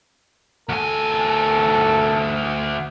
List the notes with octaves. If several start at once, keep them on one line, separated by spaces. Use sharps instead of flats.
D2 A4 G#5